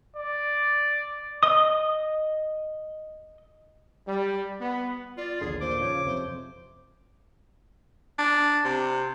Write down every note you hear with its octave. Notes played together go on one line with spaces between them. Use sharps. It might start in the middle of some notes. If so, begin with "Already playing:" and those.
D5
D#5 D#6
G3
B3
F4 D5
A#1 D#2 D3 G#4
D#2 A#2 C5 D6
C#3 F3 C#5
F2 C3 C5
D4
C3